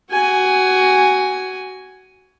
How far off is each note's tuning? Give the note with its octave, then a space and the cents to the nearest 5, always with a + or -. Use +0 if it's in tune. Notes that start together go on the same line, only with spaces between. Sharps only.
F#4 +20 G#5 +0